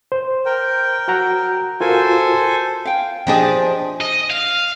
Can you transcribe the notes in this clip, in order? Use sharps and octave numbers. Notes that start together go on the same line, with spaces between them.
C5
A#4 G5
F#4 F#5 A#5
F4 F#4 A4 A#4 C5 G#5
F5 G5
F3 D4 G4 G#4 D#5 G5
D#5
F5